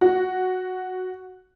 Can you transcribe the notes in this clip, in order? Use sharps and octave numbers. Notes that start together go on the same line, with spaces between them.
F#4